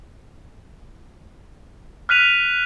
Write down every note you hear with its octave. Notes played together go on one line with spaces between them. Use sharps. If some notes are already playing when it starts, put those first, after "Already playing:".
F6 F#6 B6 D#7 F7